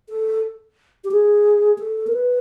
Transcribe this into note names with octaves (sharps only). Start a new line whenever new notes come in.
A4
G4
G#4
A4
A#4
B4